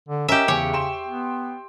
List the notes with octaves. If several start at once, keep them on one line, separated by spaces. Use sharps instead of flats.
D3
C#4 G4 A#4 D#5 E5
E2 C#3 C#5 D6
G5 C6 E7
B3